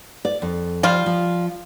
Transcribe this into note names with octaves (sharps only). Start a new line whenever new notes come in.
D5
F2
F3 G3 F4
F3